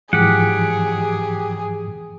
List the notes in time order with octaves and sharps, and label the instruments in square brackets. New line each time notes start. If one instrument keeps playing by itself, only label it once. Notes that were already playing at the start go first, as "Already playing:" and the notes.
[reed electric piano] G#2 E3 F3 [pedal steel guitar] G4 F#5 [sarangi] G#4